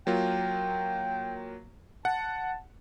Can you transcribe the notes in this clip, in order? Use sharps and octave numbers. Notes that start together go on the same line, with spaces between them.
F#3 A#3 F4 G5
F#5 A5